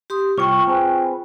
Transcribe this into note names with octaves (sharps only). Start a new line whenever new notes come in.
G4 C6 D#6
C2 F4 C#5 G5
C4 G#4 B4